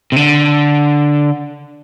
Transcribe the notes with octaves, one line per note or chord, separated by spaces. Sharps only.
C3
D3